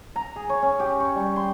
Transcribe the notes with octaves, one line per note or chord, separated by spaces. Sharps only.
A#5
G#4
C#5
C#4
G4
C#6
G3
C6